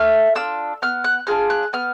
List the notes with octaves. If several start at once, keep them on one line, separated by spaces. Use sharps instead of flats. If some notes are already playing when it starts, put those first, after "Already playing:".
Already playing: A3 F6
D4 F4 E6
B3 F6
F#6
D4 F4 G#4 F6
F#6
B3 F6